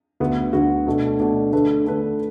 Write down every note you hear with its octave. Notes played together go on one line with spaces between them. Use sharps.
D2 D3 B3 F#4
D2 D3 B3 F#4
B2 A3 D4
B2 A3 D4
D3 A3 D4 B4
D3 A3 D4 B4